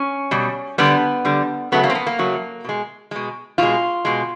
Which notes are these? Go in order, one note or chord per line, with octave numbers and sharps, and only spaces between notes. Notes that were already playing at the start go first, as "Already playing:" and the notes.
Already playing: C#4
B2 G3
D3 G3 B3
D3 G3
C#3 F#3 A3 B3
A#3
C4
B3
A#3
C#3 F#3 A3
B2 G#3
B2 G#3
B2 G#3 F4
B2 G#3